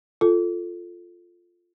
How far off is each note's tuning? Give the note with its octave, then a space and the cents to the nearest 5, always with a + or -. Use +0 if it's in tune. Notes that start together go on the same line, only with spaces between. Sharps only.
F4 +0 A4 +0